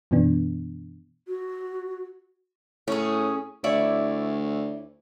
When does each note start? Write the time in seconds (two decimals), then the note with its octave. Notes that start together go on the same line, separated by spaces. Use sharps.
0.11 F#2 B2 E3 B3 D4
1.28 F#4
2.88 A2 C#4 G#4
3.64 D2 E4 C#5 D5